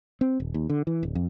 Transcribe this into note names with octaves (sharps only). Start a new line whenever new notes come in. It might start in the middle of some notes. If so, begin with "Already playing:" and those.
C4
D#1
D#2
D3
E3
D1
F2